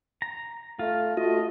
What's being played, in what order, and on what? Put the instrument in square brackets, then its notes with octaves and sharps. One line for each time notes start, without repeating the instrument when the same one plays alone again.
[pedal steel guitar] A#5
[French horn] A3 [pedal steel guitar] F4
[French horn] A3 [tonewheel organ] F4 F#4 [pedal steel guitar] D#5